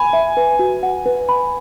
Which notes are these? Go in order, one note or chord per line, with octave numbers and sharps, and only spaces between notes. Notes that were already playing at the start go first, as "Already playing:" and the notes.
Already playing: G#5 B5
E5
B4
F#4
F#5
B4
B5